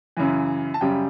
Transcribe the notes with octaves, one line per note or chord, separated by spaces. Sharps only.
F#2 C#3 E3
A5
F#2 C#3 G3 G5